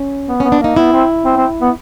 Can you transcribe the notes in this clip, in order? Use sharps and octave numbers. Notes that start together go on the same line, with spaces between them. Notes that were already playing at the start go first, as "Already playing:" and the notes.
Already playing: C#4
B3
B3 C#4
D4
A#3 D#4
B3 E4
C4
C4
C4
B3